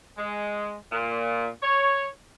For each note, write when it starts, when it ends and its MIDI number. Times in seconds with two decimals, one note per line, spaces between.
0.17 0.74 56
0.91 1.47 46
1.62 2.06 73